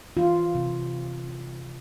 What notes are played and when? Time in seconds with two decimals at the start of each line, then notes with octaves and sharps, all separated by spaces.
0.17 E3 F4
0.55 C3